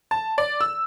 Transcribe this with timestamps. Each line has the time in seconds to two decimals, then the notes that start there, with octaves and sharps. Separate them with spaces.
0.11 A5
0.38 D5
0.61 E6